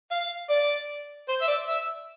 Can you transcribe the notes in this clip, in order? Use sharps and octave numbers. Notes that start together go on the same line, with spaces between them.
F5
D5
C5
E5
D5
E5